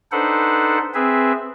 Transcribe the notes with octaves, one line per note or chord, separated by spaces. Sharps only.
D4 D#4 A4 B4 C5 F#5
C4 G#4 B4 E5